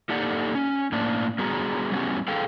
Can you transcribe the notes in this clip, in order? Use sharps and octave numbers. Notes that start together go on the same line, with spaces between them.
A#3 D#4 G4 A4 D5 F#5
C#4
A2 A#3 D4
G3 B3 F#4 G#4 A#5
G3 B3 C#4 F4 G4
G#4 A4 F5 G5